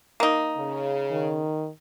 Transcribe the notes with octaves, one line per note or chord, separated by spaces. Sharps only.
A#3 D#4
C#3
D#3